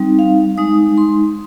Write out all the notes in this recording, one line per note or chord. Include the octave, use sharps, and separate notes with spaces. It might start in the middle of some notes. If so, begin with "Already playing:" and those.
Already playing: G3 C4 D#4
F5
G#3 D#4 D#6
C6